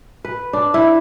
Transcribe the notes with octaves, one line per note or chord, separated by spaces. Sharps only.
B4
D4
E4